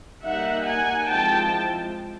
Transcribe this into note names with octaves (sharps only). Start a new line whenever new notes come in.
G3 A#3 D#4 E5 F#5
F#5 G#5
F3 G#3 C4 E4 G5 A5